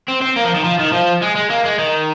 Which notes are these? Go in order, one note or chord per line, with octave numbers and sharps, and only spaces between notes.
C4
C4
A#3
F3
D#3
F3
D#3
F3
G#3
G#3
A#3
G#3
D#3